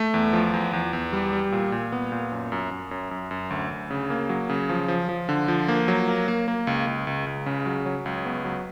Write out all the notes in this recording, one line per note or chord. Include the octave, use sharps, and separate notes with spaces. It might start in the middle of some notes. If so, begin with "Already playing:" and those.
Already playing: A3
E2
F3
E2
E2
E2
G3
G3
A#2
A#2
B3
A#2
F#2
F#2
F#2
F#2
F#2
F#2
D2
D2
C#3
A#3
F#3
C#3
F3
F3
F3
D3
F3
A#3
F#3
A#3
A#3
A#3
C#2
C#2
C#2
C#2
C#3
F#3
F#3
C#2
B3
F#3